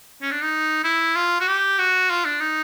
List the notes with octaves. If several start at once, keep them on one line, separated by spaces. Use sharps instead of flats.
C#4
D4
D#4
E4
F4
F#4
G4
F#4
F4
D4
D#4